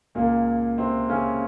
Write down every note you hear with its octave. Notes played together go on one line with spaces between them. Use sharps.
C#2 A#2 C#3 A#3
C3 C4
C#3 C#4